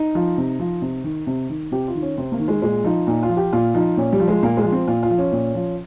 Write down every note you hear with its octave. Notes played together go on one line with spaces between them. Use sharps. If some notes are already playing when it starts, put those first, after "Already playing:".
Already playing: D#4
F3
C3
F3
C3
D#3
C3
D#3
C3 G4
F4
D#3
C#4
C3 C4
A#3
D#3
G#3
A#2 G#3
F3 D#4
A#2 D#4
F4
F3
G4
A#2 F4
F3 D#4
A#2 C#4
G3
F3
G#3
A#2 A#3
G#3
F3
C4
A#2 F4
F4
F3
C#4
A#2
F3